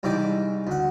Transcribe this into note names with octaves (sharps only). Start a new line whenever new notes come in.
C2 G#2 E3 D5 G5 D6
D2 F#5